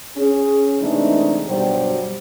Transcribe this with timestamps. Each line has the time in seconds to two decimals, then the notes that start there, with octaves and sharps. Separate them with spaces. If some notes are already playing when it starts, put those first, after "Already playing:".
0.17 C#4 G#4
0.80 C3 E3 G#3 A3 D4 D#4
1.47 G2 B2 F#3 G3 G4 C5